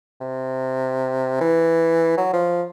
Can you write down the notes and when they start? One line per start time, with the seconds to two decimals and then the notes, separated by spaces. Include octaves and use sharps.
0.21 C3
1.41 E3
2.17 F#3
2.33 F3